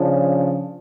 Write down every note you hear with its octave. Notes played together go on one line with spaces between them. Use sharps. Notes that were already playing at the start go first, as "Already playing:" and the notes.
Already playing: C#3 F3 D4